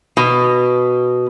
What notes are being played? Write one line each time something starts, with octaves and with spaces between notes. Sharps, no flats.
B2